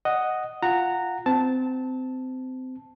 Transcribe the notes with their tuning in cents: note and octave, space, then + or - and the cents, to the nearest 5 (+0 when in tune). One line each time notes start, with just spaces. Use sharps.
D#5 +0 F#5 +0
F4 +0 F#5 +0 A#5 -15
C4 -25 A5 +0